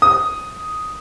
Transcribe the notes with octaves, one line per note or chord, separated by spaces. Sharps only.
D#6